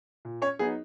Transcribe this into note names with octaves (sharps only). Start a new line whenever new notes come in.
A#2
C#4 C#5
F#3 B3 D#4 G#4